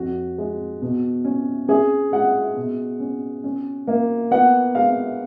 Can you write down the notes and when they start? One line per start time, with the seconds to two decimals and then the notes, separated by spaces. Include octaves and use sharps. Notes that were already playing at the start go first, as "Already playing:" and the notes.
Already playing: F2 F#4
0.38 G#3
0.82 B2
1.25 C#4
1.68 C#4 G#4
2.12 G#3 F#5
2.56 B2
3.00 C#4
3.44 C#4
3.87 A#3
4.31 B3 F#5
4.75 G#3 F5